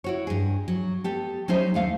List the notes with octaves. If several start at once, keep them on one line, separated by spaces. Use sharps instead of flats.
E4 F#4 C#5
G2 G#4
F#3
B3 G4 A4
F#3 G3 C#4 D#4 C5 E5
D#2 A3 F5